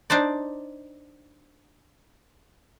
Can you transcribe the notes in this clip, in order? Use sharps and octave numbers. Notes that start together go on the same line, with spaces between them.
D4 D#4 C5 D5